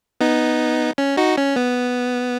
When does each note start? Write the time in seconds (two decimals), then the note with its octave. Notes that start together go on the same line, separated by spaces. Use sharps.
0.21 B3 D#4
0.98 C#4
1.17 D#4 F#4
1.38 C#4
1.56 B3